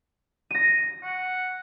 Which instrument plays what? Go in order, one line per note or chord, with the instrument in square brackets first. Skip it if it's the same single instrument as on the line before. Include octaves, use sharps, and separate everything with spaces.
[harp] A#6 D#7
[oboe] F#5